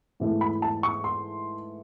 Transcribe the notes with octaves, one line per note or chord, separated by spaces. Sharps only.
G#2 E3 A3
B5
A5
C#6
C6